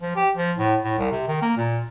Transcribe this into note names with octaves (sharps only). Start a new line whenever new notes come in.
F3
G4
F3
A2
A2
C2
C3
D#3
A#3
A#2